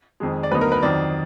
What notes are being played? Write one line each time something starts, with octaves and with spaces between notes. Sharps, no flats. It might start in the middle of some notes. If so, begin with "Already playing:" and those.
F2 D#3 G#3
D5
D2 D3 F#3 B3 D#4 B4
A#4
B4
F2 D#3 F#3 D5